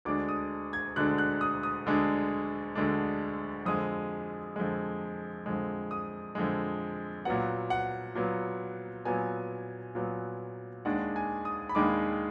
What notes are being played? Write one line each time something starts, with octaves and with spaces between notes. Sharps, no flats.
D2 D3 G#3 D4 D6
D#6
G#6
D2 D3 G#3 D4 F#6
F#6
D#6
D#6
D2 D3 G#3 D4
D2 D3 G#3 D4
F2 D3 G#3 D#6
F2 D3 G#3
F2 D3 G#3
D#6
F2 D3 G#3
A#2 F#3 B3 F#5
F#5
A#2 F#3 B3
A#2 F#3 B3 G#5
A#2 F#3 B3
D#2 D#3 G#3 D4 F#5
G#5
D#6
B5
D#2 D#3 G#3 D4 D6